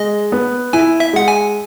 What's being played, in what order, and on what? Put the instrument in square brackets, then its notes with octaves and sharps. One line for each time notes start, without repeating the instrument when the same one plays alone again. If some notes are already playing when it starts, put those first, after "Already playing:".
Already playing: [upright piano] G#3 [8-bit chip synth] D#5
[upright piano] B3
[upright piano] E4 [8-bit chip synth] G#5
[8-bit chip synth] E5
[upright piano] G#3 [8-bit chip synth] F#5
[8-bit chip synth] G#5